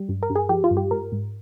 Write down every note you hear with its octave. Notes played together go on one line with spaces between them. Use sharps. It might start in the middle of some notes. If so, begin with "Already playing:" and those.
Already playing: G3
G2
A#4
G2
G#4
F3 G4
F4
G2
G4
G#2 A#4
G#2